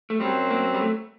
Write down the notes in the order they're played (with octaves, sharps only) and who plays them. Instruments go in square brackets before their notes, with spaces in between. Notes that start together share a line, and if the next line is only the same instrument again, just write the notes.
[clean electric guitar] A3
[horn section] F#2 F#3 C4 [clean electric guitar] G3
[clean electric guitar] A#3
G3
A3